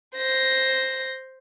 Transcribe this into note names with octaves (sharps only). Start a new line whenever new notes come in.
C5 A#6